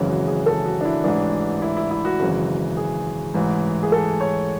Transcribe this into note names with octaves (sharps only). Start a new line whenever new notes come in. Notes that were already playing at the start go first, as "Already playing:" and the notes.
Already playing: G#1 F#2 C#3 E3
F#4
G#4
A4
F#4
D4
E4
A1 G#2 E3 D4
E4
E4
E4
F#4
G#1 F#2 C#3 E3
G#4
A1 G#2 E3
G#4
A4
C#5